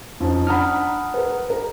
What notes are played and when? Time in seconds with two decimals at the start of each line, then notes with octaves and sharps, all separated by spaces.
0.20 F2 F3 C#4 D#4
0.47 D4 F#5 A#5 B5 D#6 F6
1.14 A#4 B4
1.50 A#4